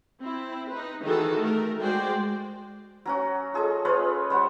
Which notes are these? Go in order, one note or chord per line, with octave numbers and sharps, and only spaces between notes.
C4 E4
D#4 B4
D#3 E3 F#4 G#4 A4
A3 A#4
G#3 F#4 C5 D5 G5
F#3 C#4 F#4
F4 G#4 A4 D#5
F4 B4 C#5 D#5
G3 C5 C#5 F#5